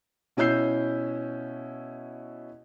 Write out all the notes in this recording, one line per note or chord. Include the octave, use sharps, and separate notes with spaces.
B2 C#4 E4 E6 G6 C7